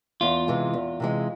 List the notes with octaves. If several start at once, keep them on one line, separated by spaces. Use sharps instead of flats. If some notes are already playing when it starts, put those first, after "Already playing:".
E2 F4
C3 E3 G#3
E2
C3 E3 G#3